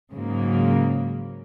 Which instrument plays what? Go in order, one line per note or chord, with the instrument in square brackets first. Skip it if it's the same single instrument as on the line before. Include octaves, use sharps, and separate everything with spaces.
[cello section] G#2 C#3 F#3 A#3